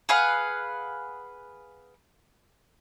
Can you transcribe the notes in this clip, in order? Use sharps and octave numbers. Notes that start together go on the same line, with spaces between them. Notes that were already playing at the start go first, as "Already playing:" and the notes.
G#4 B4 F5 F#5